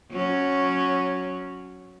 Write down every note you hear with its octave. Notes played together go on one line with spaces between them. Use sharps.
F#3 C#4